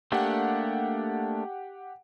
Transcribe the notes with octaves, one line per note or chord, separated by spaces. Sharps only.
A3 A#3 D4 G4 F#5